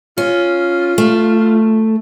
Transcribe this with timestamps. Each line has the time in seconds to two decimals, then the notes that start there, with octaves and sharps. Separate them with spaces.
0.18 C#4 F4
0.98 A3